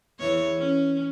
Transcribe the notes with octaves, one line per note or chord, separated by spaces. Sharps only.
E2 E3 C#5
C#4